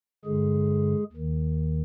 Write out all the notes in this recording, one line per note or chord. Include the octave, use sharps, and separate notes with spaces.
G2 D3 G#3 G#4
D#2 D#3